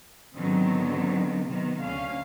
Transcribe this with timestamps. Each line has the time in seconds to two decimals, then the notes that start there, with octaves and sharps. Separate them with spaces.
0.35 G#2 D3 D#3 F#3 B3 C4
1.47 C3 D#3 B3
1.82 D2 D3 C#4 F5